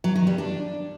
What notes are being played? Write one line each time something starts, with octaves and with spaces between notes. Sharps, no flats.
F#3
D#3
G3
D4